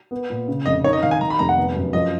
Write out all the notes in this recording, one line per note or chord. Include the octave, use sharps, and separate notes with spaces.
B3
A#2
C#3
F1 D#5
D#4 C#5
D#5
D#3 F5
G#5
D#3 A#5
B5
F1 A#5
F#5
B3
F#2
F3 D#5